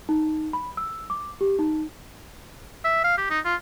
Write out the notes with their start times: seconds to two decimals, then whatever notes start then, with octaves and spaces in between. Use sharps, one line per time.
0.09 D#4
0.53 B5
0.77 E6
1.10 D6
1.41 G4
1.59 D#4
2.85 E5
3.04 F5
3.18 G4
3.30 D#4
3.45 F4